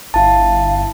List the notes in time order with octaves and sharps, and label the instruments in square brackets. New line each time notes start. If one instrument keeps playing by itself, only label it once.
[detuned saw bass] G1 [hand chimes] E4 A5 [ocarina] F5